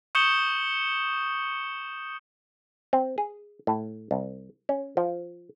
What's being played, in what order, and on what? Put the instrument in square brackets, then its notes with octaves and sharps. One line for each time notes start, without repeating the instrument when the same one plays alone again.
[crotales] C#6 D#6 G6 C#7 E7 G7
[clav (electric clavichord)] C4
G#4
A2
C2
C#4
F3